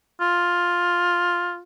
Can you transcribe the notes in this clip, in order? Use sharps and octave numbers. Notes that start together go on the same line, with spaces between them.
F4